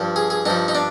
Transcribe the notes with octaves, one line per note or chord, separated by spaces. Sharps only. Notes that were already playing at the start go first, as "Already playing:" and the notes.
Already playing: G2 F3
G#4
G#4
G2 F3 D#4
D#4
D4